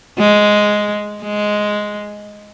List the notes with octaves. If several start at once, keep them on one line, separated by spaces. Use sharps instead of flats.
G#3
G#3